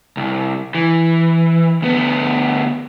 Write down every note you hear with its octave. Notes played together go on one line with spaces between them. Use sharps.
C2
E3
D2 B3